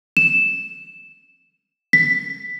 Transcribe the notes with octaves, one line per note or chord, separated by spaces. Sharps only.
E7
B6